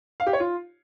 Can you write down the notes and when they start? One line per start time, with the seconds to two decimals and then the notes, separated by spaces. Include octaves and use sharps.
0.20 F5
0.26 G4
0.33 C#5
0.40 F4